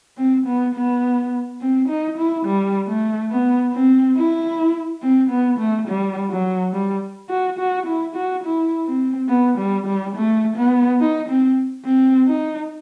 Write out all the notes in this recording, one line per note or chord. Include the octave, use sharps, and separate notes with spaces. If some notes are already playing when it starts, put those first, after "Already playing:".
C4
B3
B3
C4
D#4
E4
G3
A3
B3
C4
E4
C4
B3
A3
G3
F#3
G3
F#4
F#4
E4
F#4
E4
C4
B3
G3
G3
A3
B3
D#4
C4
C4
D#4